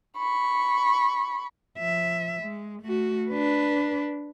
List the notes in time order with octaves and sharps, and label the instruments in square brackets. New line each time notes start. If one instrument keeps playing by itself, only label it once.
[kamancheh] B5 C#6
[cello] F3 E5
G#3
A3 F#4
D4 B4